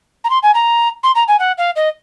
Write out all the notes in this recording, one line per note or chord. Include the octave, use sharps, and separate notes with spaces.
A#5
C6
G#5
A#5
C6
A#5
G#5
F#5
F5
D#5